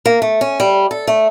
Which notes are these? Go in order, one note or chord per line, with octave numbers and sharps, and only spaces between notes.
A#3
A3
C#4
G3
A4
A3